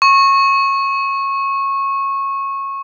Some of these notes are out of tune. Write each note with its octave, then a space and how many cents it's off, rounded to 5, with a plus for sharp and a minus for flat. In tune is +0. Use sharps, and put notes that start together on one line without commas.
C#6 -20